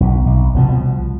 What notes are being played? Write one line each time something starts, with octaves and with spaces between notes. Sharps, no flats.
B1
B1
C2 B2 F3